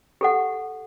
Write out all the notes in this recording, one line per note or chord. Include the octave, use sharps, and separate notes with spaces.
G4 A4 F#5